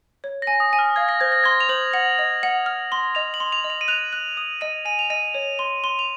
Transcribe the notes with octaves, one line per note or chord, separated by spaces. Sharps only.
C#5
G#5 A#6
D#6
G#5
F6
F5 G#6
A#6
C5 G#6
A#6
C6 G#6
F7
C5 F#7
F#5
D#5
F#5
F6
C6
D#5 F7
F#7
C6
F7
D#5
F7
D#7
F#6 F7
F#6
D#6
D#5 D#7
G#5 D#7
F7
D#5 D#7
C#5
C6
C6
F7